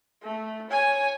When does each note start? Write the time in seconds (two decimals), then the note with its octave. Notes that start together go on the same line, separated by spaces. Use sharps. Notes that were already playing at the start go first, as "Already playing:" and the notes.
0.23 A3
0.70 C#5 G#5